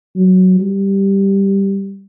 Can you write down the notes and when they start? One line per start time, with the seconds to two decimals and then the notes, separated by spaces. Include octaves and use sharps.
0.16 F#3
0.60 G3